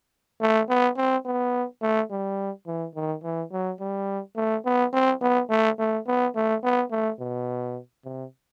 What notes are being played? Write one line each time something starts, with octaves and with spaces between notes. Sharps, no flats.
A3
B3
C4
B3
A3
G3
E3
D#3
E3
F#3
G3
A3
B3
C4
B3
A3
A3
B3
A3
B3
A3
B2
C3